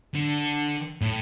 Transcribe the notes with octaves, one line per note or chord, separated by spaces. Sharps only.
D3
A2